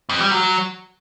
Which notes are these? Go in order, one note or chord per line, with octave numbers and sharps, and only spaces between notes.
F2
G3
F#3